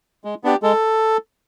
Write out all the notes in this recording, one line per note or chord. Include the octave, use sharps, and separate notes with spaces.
G#3
B3 D4 G4
G#3 A4